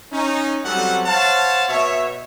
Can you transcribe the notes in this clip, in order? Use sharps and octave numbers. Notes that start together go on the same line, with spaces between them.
C#4 D#4
F#3 G3 C4 C#4 A4 F#5
C5 C#5 F5 F#5 A5
B2 C#5 E5